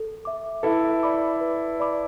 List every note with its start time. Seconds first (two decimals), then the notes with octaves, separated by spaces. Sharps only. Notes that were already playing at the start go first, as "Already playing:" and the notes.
Already playing: A4
0.25 E5 D6
0.63 E4 A4 B4
1.03 D5 B5 D6
1.41 B4
1.80 D5 B5 D6